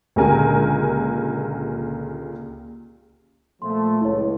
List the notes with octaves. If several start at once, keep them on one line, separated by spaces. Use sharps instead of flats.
C#2 A#2 D3 G4 A#4 G#5
A#2 F3 A3 C6
C#2 E4 C#5